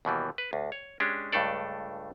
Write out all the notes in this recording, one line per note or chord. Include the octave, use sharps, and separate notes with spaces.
D#2 B2 E3 G3
B4
D2
C#5
G#3 C#4 D4 G4
C#2 G2 A3 D4 A4 D5